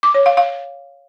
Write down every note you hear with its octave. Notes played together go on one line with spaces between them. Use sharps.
D6
C#5
F5
F5